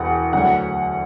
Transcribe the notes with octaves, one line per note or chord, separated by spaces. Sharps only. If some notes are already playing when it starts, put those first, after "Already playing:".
Already playing: E1 E2 F#5
D2 D3 F#3 F#5